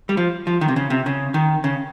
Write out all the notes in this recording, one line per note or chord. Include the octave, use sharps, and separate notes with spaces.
G3
F3
F3
D#3
C3
C#3
C3
C#3
D#3
C#3